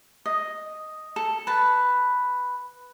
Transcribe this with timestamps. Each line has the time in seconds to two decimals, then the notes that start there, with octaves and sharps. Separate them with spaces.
0.26 D#5
1.16 A4
1.47 B4 A5